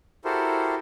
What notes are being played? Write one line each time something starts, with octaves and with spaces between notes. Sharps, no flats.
E4 F#4 G4 A4 A#4 C5